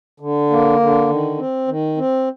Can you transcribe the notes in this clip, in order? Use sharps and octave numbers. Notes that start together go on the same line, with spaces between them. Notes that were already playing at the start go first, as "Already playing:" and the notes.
D3
A#3
D3
D#3
C4
D#3
C4